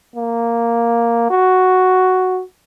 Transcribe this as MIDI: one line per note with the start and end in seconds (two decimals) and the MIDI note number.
0.16 1.28 58
1.30 2.41 66